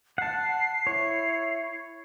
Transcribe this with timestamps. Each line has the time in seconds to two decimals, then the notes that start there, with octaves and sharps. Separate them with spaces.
0.18 F#5 A5 C7
0.87 E4 C#5